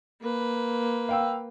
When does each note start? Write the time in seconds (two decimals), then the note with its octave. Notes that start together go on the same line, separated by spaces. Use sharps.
0.21 A#3 B4
1.09 F5 G5 E6